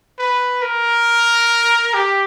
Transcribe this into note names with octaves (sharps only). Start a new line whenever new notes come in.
B4
A#4
G4